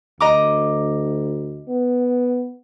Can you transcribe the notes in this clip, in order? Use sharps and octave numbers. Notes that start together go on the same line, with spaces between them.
D2 D#5 A#5 D6
B3